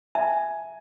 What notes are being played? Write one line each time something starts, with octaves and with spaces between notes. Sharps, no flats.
E5 G#5